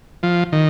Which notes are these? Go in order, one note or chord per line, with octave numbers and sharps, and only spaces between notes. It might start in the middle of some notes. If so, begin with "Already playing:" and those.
F3
D#3